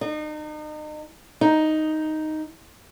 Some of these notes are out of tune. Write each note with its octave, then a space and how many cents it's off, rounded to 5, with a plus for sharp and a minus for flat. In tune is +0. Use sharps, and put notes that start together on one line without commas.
D#4 -35
D#4 +0